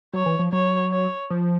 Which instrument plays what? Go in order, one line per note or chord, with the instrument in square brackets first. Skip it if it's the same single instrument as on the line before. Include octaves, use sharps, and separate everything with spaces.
[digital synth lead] F#3 [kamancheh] C#5
[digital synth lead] E3
F3
[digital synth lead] F#3 [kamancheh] C#5
[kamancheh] C#5
[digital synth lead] F3